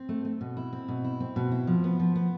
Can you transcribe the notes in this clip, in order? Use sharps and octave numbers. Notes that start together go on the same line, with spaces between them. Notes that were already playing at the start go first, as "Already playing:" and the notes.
Already playing: C4
A3
A3
B2
E4
C4
B2
E4
C4
B2
E4
F3
B3
F3
B3